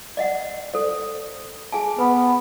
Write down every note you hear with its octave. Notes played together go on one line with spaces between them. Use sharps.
D5 D#5 F#5
A4 C5 D5
G#4 G#5 A5
B3 B4